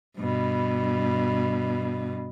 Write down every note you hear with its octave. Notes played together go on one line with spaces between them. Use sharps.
G2 B2